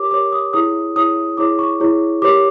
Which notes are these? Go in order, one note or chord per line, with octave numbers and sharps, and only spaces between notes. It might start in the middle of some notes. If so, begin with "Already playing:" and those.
Already playing: G4 A#4 C#5 D6
G4 A#4 C#5 D6
D#6
E4 G#4 C#5 D#6
E4 G#4 C#5 D#6
E4 G#4 C#5 D6
C#6
E4 G#4 C#5
G4 A#4 C#5 D6